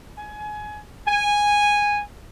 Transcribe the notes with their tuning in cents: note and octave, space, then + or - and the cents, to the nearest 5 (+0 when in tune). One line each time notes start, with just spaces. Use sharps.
G#5 +25
G#5 -10